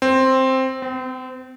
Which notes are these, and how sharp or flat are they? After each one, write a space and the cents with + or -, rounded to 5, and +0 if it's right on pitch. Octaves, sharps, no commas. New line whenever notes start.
C4 +5
C4 -35